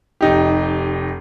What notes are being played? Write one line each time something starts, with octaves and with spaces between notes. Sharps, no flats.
F1 D#4 G4